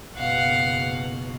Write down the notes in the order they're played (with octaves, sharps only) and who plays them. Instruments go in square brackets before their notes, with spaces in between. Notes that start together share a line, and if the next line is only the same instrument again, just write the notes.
[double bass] F#1 B2 [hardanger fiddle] F5 F#5